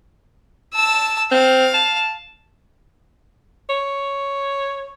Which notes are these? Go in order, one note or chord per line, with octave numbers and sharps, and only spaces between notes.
A5 E6
C4 F5
A5
C#5